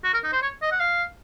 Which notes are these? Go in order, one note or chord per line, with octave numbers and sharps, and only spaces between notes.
F#4
A#4
D#4
C5
C#5
D#5
F#5
F5